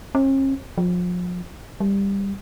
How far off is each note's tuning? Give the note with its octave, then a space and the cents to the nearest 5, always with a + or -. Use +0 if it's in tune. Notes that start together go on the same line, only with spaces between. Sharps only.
C#4 -45
F3 +35
G3 +15